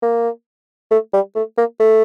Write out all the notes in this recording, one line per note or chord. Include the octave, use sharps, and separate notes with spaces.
A#3
A3
G3
A3
A#3
A3